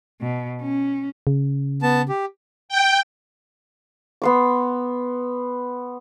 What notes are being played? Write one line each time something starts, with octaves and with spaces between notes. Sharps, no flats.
B2
C#4
C#3
B3 A5
G4
G5
B3 C6 D6